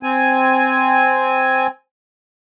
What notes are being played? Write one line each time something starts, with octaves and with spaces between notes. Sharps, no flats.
C4 G#5